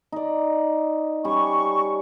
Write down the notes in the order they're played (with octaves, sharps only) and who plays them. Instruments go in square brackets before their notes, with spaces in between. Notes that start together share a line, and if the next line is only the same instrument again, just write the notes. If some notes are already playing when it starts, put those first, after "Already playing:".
[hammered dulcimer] D#4 D5
[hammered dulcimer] G3 C#4 [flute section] C#6